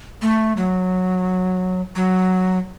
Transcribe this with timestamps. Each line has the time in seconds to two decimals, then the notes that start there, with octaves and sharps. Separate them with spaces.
0.22 A3
0.57 F#3
1.96 F#3